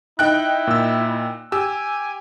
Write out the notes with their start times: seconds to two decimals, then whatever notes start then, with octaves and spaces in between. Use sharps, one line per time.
0.19 D#4 E4 G5 F#6
0.67 A#2 E6
1.52 G4 G#5 E6